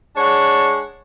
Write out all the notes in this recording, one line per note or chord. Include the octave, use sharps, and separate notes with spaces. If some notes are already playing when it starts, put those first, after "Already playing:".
G#3 D4 C#5 F#5